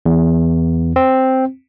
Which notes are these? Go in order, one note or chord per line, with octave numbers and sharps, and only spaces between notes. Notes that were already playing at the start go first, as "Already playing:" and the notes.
E2
C4